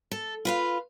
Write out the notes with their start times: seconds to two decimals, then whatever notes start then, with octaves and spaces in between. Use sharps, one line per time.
0.12 A4
0.45 F4 B4 F5